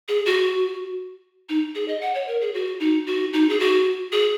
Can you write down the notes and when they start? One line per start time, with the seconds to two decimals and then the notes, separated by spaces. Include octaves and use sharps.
0.08 G#4
0.26 F#4
1.49 D#4
1.75 G#4
1.88 D#5
2.01 F#5
2.15 C#5
2.28 A#4
2.41 G#4
2.54 F#4
2.80 D#4
3.07 F#4
3.33 D#4
3.49 G#4
3.60 F#4
4.12 G#4